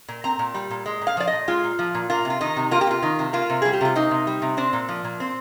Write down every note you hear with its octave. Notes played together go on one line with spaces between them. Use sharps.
A#2
C4 A#5
A#2
G3
A#2
G#3
A#2
F5
F3 D5
A#2 D#5
G#3 F4
A#2
F3
A#2
A#3 F4
C3
F4
D#3 D#4
C3
A#3 F4
G4
C3 F4
D#3
C3
A#3 F4
C3
G3 G#4
G4
C3 F4
A#3 D#4
C3
G3
C3
C4 D4
A#2
F3
A#2
C4